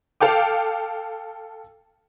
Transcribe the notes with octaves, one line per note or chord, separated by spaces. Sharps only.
A4 F5 G5 D6